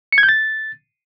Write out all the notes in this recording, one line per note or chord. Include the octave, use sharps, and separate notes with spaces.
C#7
G#6
G6
A6